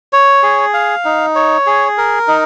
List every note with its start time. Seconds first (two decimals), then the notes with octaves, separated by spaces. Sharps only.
0.13 C#5
0.43 G#4
0.74 F5
1.05 D#4
1.35 C#5
1.66 G#4
1.98 A#4
2.28 D#4